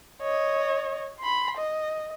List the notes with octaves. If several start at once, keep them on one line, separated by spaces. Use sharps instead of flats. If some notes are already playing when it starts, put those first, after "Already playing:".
C#5 D#5
B5 C6
D#5